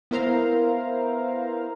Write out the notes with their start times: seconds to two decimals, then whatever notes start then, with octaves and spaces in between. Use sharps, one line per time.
0.11 B3 E4 A#4 C5 F5 A#5